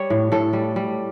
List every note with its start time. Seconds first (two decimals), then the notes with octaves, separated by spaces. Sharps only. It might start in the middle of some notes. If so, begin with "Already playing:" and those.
Already playing: G3 C#5
0.10 A2
0.32 A2 A4
0.53 G3
0.76 G3